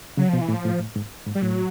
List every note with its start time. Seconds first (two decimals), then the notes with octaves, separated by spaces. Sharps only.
0.17 C#3 F#3
0.29 B2 F3
0.41 E3
0.48 A2
0.53 F3
0.65 A2
0.79 A2
0.96 G#2
1.26 G#2
1.35 G3
1.42 A2 F#3